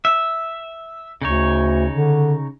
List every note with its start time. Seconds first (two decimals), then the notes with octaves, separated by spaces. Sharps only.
0.05 E5
1.22 D2 C#3 D#4 C#5
1.92 D3